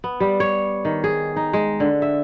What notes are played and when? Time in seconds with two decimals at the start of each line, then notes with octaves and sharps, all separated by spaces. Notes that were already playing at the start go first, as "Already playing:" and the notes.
0.04 B3
0.20 G3
0.40 C#5
0.85 D#3
1.04 G#4
1.36 D#4
1.53 G#3
1.80 D3
2.02 E5